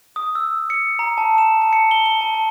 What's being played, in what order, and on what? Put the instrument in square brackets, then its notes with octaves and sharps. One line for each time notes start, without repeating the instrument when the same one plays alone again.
[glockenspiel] D#6
E6
C#7
A#5
A5
E7
A5
C#7
G7
G7
A5
A5